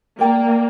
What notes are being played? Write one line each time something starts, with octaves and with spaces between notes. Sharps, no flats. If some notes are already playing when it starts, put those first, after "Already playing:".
A#3 A#4 D5 G5 A#5